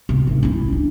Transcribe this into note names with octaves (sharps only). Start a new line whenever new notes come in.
C3
G#1
C#4 E4
D4